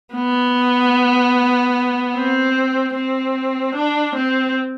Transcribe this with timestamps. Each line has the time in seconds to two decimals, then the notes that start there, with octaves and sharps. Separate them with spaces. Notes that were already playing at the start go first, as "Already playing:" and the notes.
0.15 B3
2.15 C4
2.95 C4
3.75 D4
4.15 C4